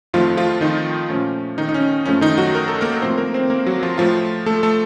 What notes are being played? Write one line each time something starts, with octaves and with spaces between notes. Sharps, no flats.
F2 D#3 F3 A3 F4
F3 F4
D#3 D#4
A#2 F3 A3 C#4
D#3 D#4
D#4
C#4
F#2 F3 A3 C#4
D#3 D#4
F#3 F#4
A#4
A4
A#3 A#4
A2 F3 A3 C4 C5
A#3 A#4
C4 C5
A#3 A#4
F#3 F#4
F3 F4
A2 F3 A3 F4
A3 A4
A3 A4